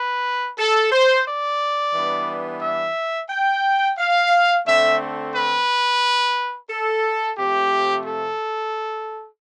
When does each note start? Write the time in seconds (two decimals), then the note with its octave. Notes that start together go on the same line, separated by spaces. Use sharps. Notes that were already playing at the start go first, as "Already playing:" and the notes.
Already playing: B4
0.58 A4
0.92 C5
1.27 D5
1.94 E3 G3 B3 D4
2.61 E5
3.30 G5
3.98 F5
4.66 D3 A3 C4 E5
5.35 B4
6.70 A4
7.38 C3 F3 A3 G4
8.06 A4